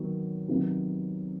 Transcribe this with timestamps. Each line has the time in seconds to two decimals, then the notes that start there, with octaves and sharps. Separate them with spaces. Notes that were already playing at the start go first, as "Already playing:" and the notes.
Already playing: D#3 F#3 B3 F#4
0.48 C3 D#3 F#3 B3 D#4